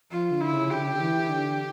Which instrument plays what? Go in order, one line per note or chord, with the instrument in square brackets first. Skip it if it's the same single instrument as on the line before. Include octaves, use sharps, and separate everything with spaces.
[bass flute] F3 [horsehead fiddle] F4
[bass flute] D3
[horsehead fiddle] E4
[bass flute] C#3
[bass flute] D3 [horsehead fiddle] G4
[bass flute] C#3
D3
E3
D3